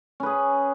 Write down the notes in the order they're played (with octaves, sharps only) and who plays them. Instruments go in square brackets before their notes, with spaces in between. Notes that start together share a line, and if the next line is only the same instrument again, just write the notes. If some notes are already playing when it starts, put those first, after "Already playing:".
[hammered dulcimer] C#4
B4
G#4